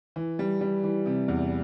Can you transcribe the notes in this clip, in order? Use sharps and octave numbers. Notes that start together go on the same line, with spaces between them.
E3
G3
G3
E3
C3
E2